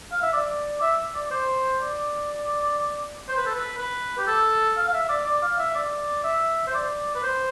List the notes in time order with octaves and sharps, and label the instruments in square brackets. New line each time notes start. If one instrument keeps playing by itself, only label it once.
[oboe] F5
E5
D5
E5
D5
C5
D5
C5
B4
A4
B4
B4
G4
A4
F5
F5
E5
D5
D5
F5
E5
D5
E5
C5
D5
B4
C5